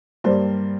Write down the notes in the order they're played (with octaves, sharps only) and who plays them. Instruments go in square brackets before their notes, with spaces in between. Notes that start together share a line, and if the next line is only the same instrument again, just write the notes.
[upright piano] G2 G3 A#3 C5